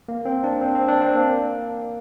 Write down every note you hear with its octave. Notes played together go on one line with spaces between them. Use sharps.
A#3
C4
D4
C4
C4
D4
C4
A#3